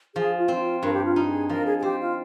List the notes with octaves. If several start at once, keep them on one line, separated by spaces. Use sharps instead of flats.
F3 G#4
F4
C4
D#4
F4
G2 A#4
G4
F4
D#4
G#4
F3 A#4
G#4
G#4
C4 G4
F4